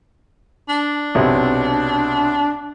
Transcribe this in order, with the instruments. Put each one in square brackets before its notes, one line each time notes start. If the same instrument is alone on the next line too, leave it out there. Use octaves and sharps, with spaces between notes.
[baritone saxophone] D4
[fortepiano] B1 C3